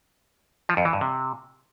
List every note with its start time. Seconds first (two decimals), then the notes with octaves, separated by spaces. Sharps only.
0.69 F3
0.77 F2
0.85 E3
0.93 G2
1.01 C3